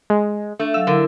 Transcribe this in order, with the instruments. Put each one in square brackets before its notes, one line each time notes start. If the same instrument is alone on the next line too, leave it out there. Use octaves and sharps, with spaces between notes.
[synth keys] G#3
[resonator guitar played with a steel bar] A3 [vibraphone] D4
[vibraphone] F#3 F5 [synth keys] E6
[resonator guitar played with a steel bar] D3 [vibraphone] E4 A#4